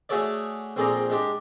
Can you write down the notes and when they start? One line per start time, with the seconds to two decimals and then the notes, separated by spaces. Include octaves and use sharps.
0.09 A3 F#4 G#4 A4 C#5 D5
0.76 A#1 C4 G#4 A4 D5 A#5
1.10 G#3 D4 G4